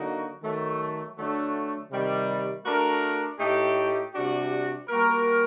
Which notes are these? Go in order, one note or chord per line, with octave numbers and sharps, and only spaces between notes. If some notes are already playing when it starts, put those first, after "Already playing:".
Already playing: D3 F#3 A#3 D#4 F#4
D#3 F#3 A3
D3 F#3 A3 D4
C3 D#3 G3
A3 D4 F#4 A#4
A2 A3 D#4 G4
C3 G3 D4 F#4
G3 A#3 F#4 A#4